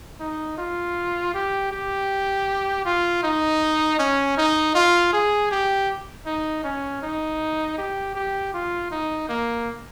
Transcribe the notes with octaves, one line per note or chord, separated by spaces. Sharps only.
D#4
F4
G4
G4
F4
D#4
C#4
D#4
F4
G#4
G4
D#4
C#4
D#4
G4
G4
F4
D#4
A#3